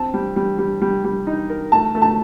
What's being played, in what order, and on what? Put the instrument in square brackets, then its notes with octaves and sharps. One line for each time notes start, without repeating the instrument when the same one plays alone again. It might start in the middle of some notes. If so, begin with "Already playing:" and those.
Already playing: [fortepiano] C4 [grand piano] A5
[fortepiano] G3
G3
G3
G3
G3
D#4
A#4
[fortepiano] A3 [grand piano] A5
[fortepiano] A3
[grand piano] A5